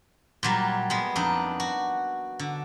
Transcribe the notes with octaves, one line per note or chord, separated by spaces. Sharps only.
A#2 F#3 G3
G#3 B3
F2 D4 D#4
F#4
D3